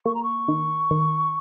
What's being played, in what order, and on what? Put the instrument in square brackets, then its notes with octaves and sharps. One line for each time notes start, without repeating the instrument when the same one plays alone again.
[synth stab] A#3 [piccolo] C#6
[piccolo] A#5
C#6
[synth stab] D#3
D#3